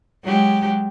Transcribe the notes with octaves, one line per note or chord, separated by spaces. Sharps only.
F#3 G#3 G4